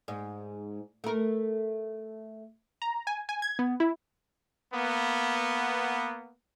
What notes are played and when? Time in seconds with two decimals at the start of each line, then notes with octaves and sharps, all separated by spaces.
0.08 G#2
1.04 A3 A#4
2.82 A#5
3.07 G#5
3.29 G#5
3.42 G#6
3.59 B3
3.80 E4
4.74 A#3 B3